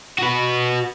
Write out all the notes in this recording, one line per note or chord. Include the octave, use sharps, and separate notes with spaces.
F#4 B4